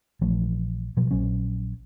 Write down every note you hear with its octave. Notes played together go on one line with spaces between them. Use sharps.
A#1 E3 F3 A3
B2 F3 F#3
A#1 F#3 C#4